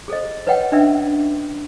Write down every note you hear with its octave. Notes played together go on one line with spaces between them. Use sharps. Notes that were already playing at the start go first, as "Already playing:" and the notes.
G#4 A4 C5 D#5
A#4 B4 C#5 D#5 F#5 G5
C#4 D4 B4 D#5 E5 E6